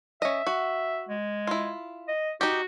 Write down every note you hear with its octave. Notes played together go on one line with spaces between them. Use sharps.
C#4 D#5 E5
F#4
G#3
E4 F4
D#5
D#4 F#4 G4